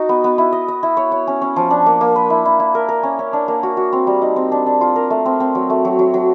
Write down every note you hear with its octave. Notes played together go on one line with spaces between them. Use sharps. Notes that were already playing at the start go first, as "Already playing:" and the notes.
Already playing: D#4 F#4
B3
B3
E4
D#5
D#5
E4
C#5
C#5
C#4
C#4
F3
D4
A#3
A#3
B4
E4
E4
E4
A#4
A#4
C#4
C#4
D4
A#3
F#4
F#4
C4
G3
D#4
C4
D4
D4
F4
A#4
A3
C4
C4
F#3
A3
F#3
F#3
F#3